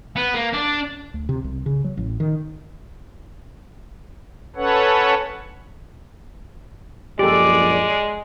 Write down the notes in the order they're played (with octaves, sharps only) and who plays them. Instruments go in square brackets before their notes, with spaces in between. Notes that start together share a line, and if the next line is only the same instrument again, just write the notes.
[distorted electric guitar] B3
A#3
D4
[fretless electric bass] D2
C3
C2
C#3
F#3
A1
D#3
[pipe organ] C#4 A4 B4 C#5 F#5
[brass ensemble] A#1 F#2 [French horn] G#3 [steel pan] G4 A4 [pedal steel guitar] D5